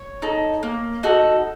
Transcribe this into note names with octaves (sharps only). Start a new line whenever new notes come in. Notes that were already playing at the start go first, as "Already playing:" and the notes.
Already playing: C#5
D#4 A4
A#3
D#4 F#4 A4